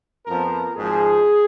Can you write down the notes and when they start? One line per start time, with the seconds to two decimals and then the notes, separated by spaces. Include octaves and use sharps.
0.26 F2 F3 B3 A#4
0.76 G#1 G#2 F3 G#4